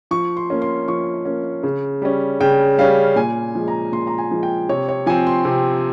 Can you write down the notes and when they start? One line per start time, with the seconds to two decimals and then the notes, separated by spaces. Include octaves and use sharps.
0.11 F3 C#6
0.37 C6
0.50 A#3 C#4
0.62 C6
0.88 F3 C#6
1.25 A#3 C#4
1.63 C#3
2.02 G3 C#4
2.40 C#3 G5
2.78 G3 C#4 F5
3.16 A#2 G#5
3.55 F3 G#3
3.68 A#5
3.92 A#2 C6
4.07 A#5
4.18 G#5
4.31 F3 G#3
4.43 G5
4.69 C3 C#5
4.88 C#5
5.06 F3 C4 G#5
5.27 C6
5.45 C3